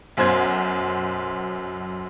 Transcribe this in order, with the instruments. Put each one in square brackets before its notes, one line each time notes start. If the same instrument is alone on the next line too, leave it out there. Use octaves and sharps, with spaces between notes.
[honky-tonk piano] B1 F#2 C5 G#6